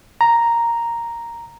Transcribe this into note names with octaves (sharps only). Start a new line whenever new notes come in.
A#5